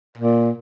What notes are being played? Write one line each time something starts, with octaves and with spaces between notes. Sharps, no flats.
A#2